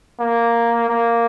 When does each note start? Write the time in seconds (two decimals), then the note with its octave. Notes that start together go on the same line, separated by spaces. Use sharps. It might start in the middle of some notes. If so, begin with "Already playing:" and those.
0.20 A#3
0.89 A#3